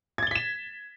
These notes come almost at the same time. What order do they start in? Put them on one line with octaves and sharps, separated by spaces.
G#6 A6 G7 B6 E7